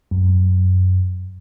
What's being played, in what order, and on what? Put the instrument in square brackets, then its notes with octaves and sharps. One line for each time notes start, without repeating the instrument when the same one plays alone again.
[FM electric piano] F#2